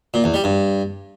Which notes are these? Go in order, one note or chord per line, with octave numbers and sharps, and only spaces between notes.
A#2
E2
G3
G2